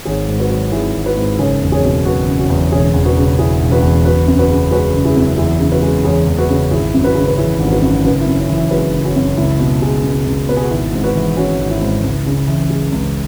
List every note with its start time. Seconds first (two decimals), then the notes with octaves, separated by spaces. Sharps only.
0.05 G#1 G#4 C#5
0.28 G#2
0.40 F#4 B4
0.50 F#3
0.72 G#1 E4 G#4
0.94 G#1
1.05 F#4 B4
1.17 G#2
1.39 F#1 G#4 C#5
1.61 E2
1.72 G#4 C#5
1.84 B2
2.05 F#3 F#4 B4
2.28 F#1
2.39 C#4 F#4
2.50 E2
2.72 E1 G#4 C#5
2.94 E2
3.05 F#4 B4
3.17 C#3
3.39 E1 E4 G#4
3.61 E1
3.71 F#4 B4
3.82 E2
4.05 F#1 F#4 B4
4.27 F#2
4.39 F#4 B4
4.49 C#3
4.71 G#3 F#4 B4
4.93 F#1
5.05 E4 G#4
5.17 F#2
5.38 E2 E4 G#4
5.60 C#3
5.72 F#4 B4
5.82 G#3
6.04 E2 G#4 C#5
6.26 E2
6.38 F#4 B4
6.49 C#3
6.71 G#1 E4 G#4
6.94 F#2
7.04 F#4 B4
7.15 C#3
7.28 B4
7.38 E3 E4 G#4
7.60 G#1
7.67 G#4
7.71 F#4 B4
7.82 F#2
8.04 F#1 F#4 B4
8.20 E4
8.26 F#2
8.38 C#4
8.49 E3 E4
8.71 G#3 F#4 B4
8.93 F#1
9.04 C#4 F#4
9.16 F#2
9.37 C#2 E4
9.59 B2
9.82 G#3
10.03 C#2
10.26 C#2
10.49 B2 B4
10.57 G#4
10.63 F#4
10.70 G#1 E4
10.93 G#2
11.04 F#4 B4
11.15 E3
11.37 G#3 C#4 F#4
11.59 G#1
11.70 E4
11.82 G#2
12.04 C#2
12.26 C#3
12.48 E3
12.70 G#3
12.92 C#2